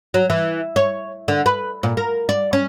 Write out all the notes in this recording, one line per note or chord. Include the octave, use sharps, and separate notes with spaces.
F#3
E3
C#5
D3
B4
A#2
A#4
D5
C#4